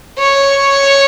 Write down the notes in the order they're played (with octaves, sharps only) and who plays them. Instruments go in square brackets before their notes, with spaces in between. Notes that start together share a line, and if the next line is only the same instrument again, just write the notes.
[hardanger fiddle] C#5